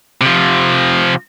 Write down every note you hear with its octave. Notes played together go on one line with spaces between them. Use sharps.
C3 F3